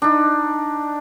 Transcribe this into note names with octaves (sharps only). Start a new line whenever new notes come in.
D4 D#4